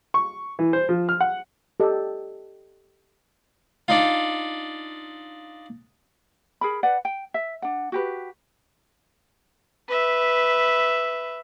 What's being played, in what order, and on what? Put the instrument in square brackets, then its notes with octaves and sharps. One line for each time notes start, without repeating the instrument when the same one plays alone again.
[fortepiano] C#6
E3
C5
F3
F6
F#5
[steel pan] G4 A4 D#5
[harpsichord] D4 D#4 F4
[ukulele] G#4 A#4 B5
B4 D5 F#5
G5
E5
D4 F#5
F#4 G4 B4
[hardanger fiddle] B4 E5